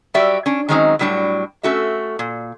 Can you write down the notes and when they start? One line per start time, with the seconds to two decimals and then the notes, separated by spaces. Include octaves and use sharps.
0.14 F#3 G3 F#4 G4 D5 E5
0.46 C#4 D4
0.69 D#3 F#3 G#3 C4 C#4 D#4
0.99 A2 F#3 G3 D4 F#4
1.63 A3 C#4 F#4 A4 E5
2.19 A#2